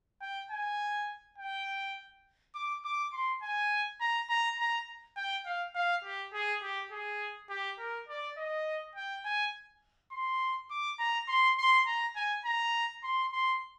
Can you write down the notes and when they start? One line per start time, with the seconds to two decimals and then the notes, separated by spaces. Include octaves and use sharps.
0.22 G5
0.51 G#5
1.38 G5
2.55 D6
2.84 D6
3.13 C6
3.42 G#5
4.00 A#5
4.29 A#5
4.59 A#5
5.17 G5
5.46 F5
5.75 F5
6.04 G4
6.33 G#4
6.62 G4
6.92 G#4
7.50 G4
7.79 A#4
8.08 D5
8.37 D#5
8.95 G5
9.25 G#5
10.11 C6
10.70 D6
10.99 A#5
11.28 C6
11.58 C6
11.86 A#5
12.16 G#5
12.45 A#5
13.03 C6
13.33 C6